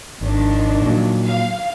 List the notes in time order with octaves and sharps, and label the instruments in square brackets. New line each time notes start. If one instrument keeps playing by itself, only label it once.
[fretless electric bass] G#1 [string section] D#3 F3 D4
[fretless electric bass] A#2 F#3
[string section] F5